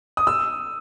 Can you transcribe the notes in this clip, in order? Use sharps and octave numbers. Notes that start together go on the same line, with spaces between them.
D#6
E6